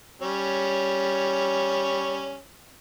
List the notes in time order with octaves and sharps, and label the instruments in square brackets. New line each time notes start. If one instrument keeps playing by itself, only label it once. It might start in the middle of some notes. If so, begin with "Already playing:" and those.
[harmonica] G3 C#4 C#5